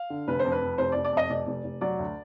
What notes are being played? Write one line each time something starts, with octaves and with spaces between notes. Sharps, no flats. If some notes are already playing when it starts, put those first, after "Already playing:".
Already playing: F5
D3
F1 B4
C5
F2
B4
F2
F1 C5
D5
F1
D5
F2 D#5
F1 D5
F1
F1
F#3 D5
D2